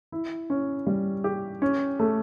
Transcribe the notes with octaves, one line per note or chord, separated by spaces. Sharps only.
E4
C#4
G3
G4
C#4
A3